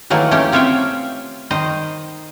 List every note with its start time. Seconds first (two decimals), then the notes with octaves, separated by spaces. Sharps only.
0.10 D#3 E3 F#3 A3 A#3
0.31 A3 C#4 G4 G5
0.52 C4 F4 C#5 E5 F5 G5
1.51 D#3 C5 D#5